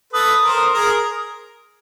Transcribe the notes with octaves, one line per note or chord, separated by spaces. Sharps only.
A4 B4 D#6
A#4 C5
G#4 A#4